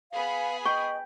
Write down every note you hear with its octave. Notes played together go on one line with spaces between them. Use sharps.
B3 G#4 F5 B5
D#5 G5 C#6